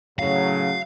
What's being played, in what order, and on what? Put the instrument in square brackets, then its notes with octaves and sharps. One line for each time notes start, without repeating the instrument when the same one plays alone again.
[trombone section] A2 C#3 F#3 [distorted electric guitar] F5